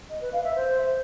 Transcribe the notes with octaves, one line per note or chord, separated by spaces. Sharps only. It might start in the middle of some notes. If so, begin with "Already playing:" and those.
D#5
B4
F5
E5
C5